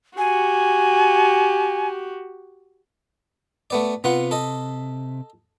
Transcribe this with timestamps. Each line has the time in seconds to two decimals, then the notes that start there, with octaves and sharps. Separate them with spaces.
0.18 F#4 G4 G#5
3.70 A3 B3 D5
4.04 C3 B3 F4 F#5
4.31 A4 D#5